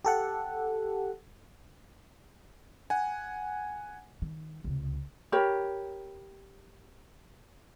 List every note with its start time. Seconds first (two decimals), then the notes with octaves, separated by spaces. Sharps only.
0.05 G4 A4 F#5
2.90 F#5 G#5
4.22 D#3
4.64 C#2 C3
5.32 G4 A#4 C#5 B5